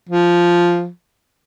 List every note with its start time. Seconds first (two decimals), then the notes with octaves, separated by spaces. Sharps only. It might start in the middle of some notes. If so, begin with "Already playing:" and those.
0.09 F3